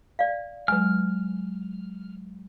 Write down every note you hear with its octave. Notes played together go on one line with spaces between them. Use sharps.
D5 F5
F#3 G#3 B4 G#5 F6